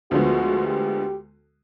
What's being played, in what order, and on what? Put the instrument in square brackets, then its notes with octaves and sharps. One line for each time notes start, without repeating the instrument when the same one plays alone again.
[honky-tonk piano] D2 D3 F3 G#3 B3 [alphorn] F#4
[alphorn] G4